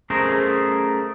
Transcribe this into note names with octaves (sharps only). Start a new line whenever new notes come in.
A3 C#4 G#4 A#4 C5